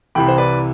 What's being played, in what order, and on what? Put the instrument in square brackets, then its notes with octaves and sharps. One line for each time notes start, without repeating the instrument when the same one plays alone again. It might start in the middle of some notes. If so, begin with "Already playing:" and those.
[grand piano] C2 C3 E3 G5 B5
C5
B4 D5